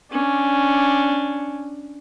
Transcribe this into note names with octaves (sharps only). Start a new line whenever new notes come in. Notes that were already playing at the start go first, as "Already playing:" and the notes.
C#4 D4